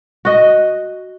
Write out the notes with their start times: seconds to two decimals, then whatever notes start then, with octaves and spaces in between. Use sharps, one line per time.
0.25 F#4 D#5